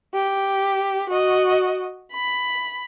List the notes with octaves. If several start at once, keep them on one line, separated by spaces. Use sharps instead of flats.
G4
F#4 D#5
B5